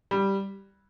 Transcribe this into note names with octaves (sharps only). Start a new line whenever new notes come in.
G3